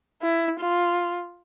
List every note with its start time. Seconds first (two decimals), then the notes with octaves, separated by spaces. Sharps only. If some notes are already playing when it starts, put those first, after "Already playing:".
0.22 E4
0.60 F4